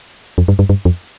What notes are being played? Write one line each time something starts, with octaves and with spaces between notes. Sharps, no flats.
F2
G2
G2
G2
F2